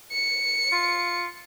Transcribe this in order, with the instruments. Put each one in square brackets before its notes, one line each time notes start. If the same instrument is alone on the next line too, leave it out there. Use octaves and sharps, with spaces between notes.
[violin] C#7
[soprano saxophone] F4